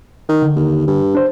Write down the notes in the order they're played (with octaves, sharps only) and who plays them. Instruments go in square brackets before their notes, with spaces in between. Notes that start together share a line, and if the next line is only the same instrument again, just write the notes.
[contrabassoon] D#3
[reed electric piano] D3
[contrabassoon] D#2
G2
[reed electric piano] D4 C5